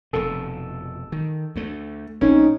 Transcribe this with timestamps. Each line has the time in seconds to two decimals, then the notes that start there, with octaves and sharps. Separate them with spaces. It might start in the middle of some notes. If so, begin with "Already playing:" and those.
0.13 F1 B2 A4
1.12 D#3
1.56 D2 A3
2.21 A#1 C4 C#4 D#4